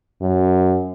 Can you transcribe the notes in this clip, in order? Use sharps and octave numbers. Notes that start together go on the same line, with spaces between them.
F#2